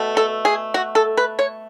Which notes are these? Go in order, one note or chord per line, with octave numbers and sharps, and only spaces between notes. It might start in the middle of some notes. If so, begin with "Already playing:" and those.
Already playing: B2 A3
A4
G#4
F#4
A4
B4
C#5